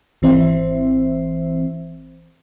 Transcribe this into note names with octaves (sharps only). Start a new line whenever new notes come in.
G#1 E3 C4 C5 E5